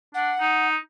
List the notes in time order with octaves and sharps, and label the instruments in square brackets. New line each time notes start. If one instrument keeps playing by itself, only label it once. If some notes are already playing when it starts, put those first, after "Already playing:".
[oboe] D4 [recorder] F#5
[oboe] D#4